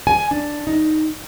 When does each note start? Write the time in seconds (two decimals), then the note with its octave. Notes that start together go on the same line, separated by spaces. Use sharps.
0.07 G#5
0.31 D4
0.67 D#4